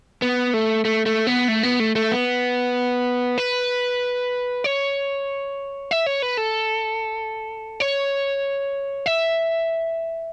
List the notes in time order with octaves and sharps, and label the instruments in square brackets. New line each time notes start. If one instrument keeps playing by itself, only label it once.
[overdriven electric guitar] B3
A3
A3
A3
B3
A3
B3
A3
A3
B3
B4
C#5
E5
C#5
B4
A4
C#5
E5